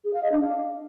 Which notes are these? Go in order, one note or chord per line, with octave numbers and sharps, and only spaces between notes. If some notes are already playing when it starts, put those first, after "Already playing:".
G#4
F5
D#5
D4
F5